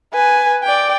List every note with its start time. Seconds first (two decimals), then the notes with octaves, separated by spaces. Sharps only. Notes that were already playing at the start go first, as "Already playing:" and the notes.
0.13 B4 G#5
0.63 D5 G5